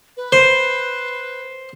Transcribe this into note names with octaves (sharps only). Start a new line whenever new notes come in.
B4
C5